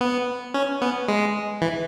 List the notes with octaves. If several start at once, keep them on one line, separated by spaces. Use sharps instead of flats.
B3
C#4
B3
G#3
E3